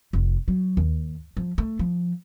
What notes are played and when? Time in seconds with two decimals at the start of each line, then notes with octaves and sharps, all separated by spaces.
0.13 F1
0.48 F#3
0.77 D#2
1.37 F3
1.58 A3
1.79 F3